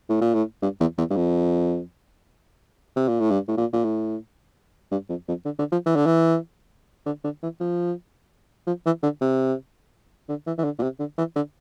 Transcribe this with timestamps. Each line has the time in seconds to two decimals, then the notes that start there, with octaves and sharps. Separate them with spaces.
0.09 A2
0.21 A#2
0.34 A2
0.63 G2
0.81 E2
0.98 E2
1.10 G2
1.17 F2
2.96 C3
3.08 A#2
3.20 A2
3.31 G2
3.48 A2
3.57 A#2
3.73 A#2
3.84 A2
4.91 G2
5.09 F2
5.28 F2
5.45 D3
5.59 D3
5.72 F3
5.86 E3
5.96 D3
6.06 E3
7.06 D3
7.24 D3
7.43 E3
7.60 F3
8.67 F3
8.86 E3
9.03 D3
9.21 C3
10.29 D3
10.47 E3
10.58 E3
10.64 D3
10.79 A#2
10.83 C3
11.00 D3
11.18 E3
11.36 D3